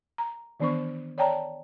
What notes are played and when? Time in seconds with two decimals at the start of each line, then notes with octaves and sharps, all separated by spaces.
0.18 A#5
0.60 D#3 E3 B3 D4 C5 C#6
1.18 C#5 D5 G5 A5 A#5